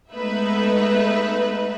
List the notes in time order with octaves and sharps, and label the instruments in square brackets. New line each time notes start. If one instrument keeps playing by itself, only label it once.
[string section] G#3 A3 B3 D#4 B4 E5